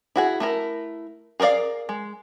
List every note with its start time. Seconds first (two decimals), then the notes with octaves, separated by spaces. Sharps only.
0.16 E4 F#4 G#4
0.40 A3 E4 A#4
1.40 G#4 A#4 B4 D5 F5
1.89 G#3